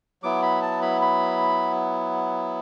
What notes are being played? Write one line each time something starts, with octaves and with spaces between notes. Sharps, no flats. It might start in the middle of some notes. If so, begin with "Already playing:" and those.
F#3 B3 E4 D6
B5
A5
B5
B5